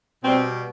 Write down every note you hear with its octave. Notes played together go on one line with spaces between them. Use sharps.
B2 G3 C4